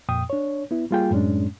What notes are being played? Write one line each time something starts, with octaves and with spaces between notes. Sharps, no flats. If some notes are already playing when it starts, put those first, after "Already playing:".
F2 A#2 G5 D#6
D4 C#5
B3 E4
G3 A#3 F4 G#4 G5
F#2 A2 G#3 C#4 D4